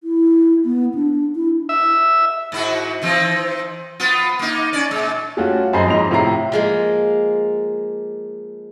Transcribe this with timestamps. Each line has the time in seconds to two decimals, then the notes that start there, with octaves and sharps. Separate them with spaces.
0.04 E4
0.65 B3
0.95 D4
1.36 E4
1.69 E5
2.52 G#2 E4 F#4
3.02 D#3 E3 C4
4.00 B3 F4
4.39 A#3 D#4
4.73 C#4 D5
4.91 A#2 G#3
5.37 G3 A3 C#4 F4 F#4
5.73 F#2 G#4 C5 D#5 B5 C7
5.87 F2 G#2 D#5 F7
6.11 A2 C3 F3 E4 A#5 C7
6.52 F3 G#3 A#3